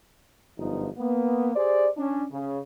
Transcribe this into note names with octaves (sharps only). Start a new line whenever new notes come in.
G1 F#2 F3 B3 D#4
A#3 B3
G4 G#4 C5 D5
C#4 D4
C#3